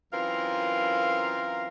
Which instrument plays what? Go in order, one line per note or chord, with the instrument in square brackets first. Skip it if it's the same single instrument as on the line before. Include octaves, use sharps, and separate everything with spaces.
[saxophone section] F#2 E3 C4 F4 A#4 F5